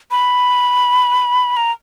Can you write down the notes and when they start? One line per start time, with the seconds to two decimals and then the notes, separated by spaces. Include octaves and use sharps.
0.11 B5
1.57 A#5